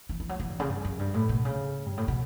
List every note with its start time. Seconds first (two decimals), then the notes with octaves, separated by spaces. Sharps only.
0.09 E3
0.20 E3
0.29 F#3
0.40 E3
0.49 G2
0.60 C#3
0.69 G2
0.84 F#2
0.99 G2
1.14 A2
1.29 B2
1.45 C#3
1.86 G2
1.97 A2
2.08 B2